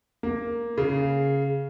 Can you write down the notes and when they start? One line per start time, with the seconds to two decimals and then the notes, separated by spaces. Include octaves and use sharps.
0.23 A#3
0.78 C#3